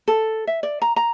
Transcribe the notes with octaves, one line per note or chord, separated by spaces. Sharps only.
A4
E5
D5
A#5
A#5